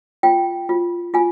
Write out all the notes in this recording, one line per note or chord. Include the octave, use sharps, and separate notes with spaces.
F4 G5
F4
F4 G#5